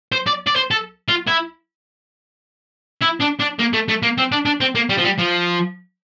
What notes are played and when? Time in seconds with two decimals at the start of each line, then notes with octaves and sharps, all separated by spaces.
0.12 C5
0.27 D5
0.47 D5
0.56 C5
0.71 A4
1.09 F4
1.28 E4
3.02 E4
3.21 D4
3.40 D4
3.59 A#3
3.73 A3
3.88 A3
4.03 A#3
4.18 C4
4.32 D4
4.45 D4
4.61 C4
4.75 A#3
4.89 G3
4.97 F3
5.04 G3
5.18 F3